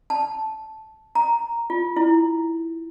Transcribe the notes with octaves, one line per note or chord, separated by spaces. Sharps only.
A5
A#5
F4
E4